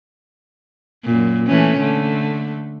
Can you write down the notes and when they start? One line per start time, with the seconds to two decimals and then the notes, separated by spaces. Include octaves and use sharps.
1.05 F#2 A#2
1.47 E3 A3 C#4
1.80 D3 A3